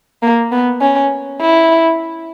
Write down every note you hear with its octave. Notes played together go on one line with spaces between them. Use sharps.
A#3
B3
C#4
E4